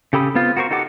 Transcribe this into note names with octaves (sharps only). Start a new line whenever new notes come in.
C#3 G4 A4 B5 D#6
B3 C4 F4
F#4 A#4 C5 C#6
D#4 G4 A4 F#5 D6